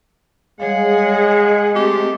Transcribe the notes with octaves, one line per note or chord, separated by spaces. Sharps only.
G3 G#3 G#4 C#5 F5 F#5
D#5
A3 C4 G4